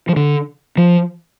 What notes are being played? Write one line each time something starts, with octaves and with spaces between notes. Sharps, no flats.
F3
D3
F3